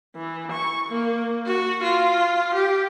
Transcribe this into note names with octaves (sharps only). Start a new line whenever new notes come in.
E3
C#6
A#3
F#4
F4
G4